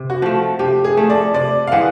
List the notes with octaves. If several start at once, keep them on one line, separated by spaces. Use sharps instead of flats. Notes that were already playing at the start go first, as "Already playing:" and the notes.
Already playing: C3
F#4
F3 A3
C3 G4
G#4
F3 A3
D5
C3 D5
F5
E3 G#3 C4 F#5